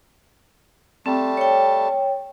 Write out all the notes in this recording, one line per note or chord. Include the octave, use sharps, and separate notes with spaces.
G3 A3 C4 A5
C#5 G5